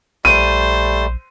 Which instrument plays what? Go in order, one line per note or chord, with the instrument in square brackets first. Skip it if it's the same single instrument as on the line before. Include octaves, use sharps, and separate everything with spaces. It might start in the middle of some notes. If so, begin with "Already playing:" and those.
[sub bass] A#1 [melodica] G3 A3 [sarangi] C5 [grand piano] D#7